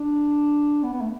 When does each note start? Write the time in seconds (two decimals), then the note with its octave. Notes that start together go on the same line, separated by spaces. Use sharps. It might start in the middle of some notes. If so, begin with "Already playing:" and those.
Already playing: D4
0.83 B3
0.93 B3
1.01 A3